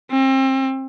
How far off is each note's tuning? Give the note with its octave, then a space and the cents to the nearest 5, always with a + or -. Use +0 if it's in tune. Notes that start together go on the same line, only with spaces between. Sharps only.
C4 +30